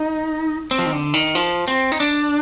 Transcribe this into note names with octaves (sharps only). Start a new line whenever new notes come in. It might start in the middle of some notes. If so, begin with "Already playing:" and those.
Already playing: D#4
C4
F3
D#3
D3
D#3
F3
C4
D#4
D4